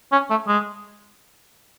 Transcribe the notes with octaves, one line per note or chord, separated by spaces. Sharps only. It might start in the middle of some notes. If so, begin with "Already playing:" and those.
C#4
A3
G#3